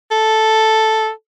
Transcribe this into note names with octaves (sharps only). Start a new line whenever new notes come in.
A4